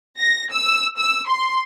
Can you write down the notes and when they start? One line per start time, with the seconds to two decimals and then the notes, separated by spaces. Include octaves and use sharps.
0.19 A#6
0.51 E6
0.97 E6
1.27 C6